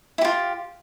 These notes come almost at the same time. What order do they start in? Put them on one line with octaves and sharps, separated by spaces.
E4 G4 F4